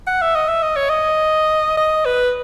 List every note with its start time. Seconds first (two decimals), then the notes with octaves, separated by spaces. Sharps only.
0.07 F#5
0.22 E5
0.36 D#5
0.49 E5
0.63 D#5
0.76 C#5
0.90 D#5
1.77 D#5
2.06 B4